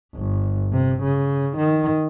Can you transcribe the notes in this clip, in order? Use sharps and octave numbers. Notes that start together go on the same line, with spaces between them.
G1
C3
C#3
D#3